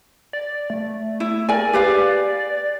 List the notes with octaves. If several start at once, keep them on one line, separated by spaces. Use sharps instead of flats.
D5
A3
E4
A#4 D5 G#5
G4 B4 F5